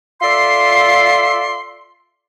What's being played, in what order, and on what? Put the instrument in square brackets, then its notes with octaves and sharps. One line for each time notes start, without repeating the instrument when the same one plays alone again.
[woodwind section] F4 A4 D5 E5 C6